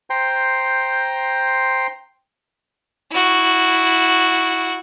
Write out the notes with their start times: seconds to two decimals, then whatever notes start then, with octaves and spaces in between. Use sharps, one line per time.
0.10 C5 G5 A#5 C6
3.11 E4 F#4